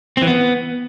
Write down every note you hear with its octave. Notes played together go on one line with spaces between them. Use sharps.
C4
E3
B3